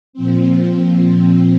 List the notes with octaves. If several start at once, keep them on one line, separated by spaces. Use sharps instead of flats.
A#2 F3 C4